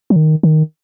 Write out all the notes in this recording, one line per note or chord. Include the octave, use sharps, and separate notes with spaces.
F#3
D#3
D#3